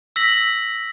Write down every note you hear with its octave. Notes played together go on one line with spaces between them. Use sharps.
E6 A#6 B6 F#7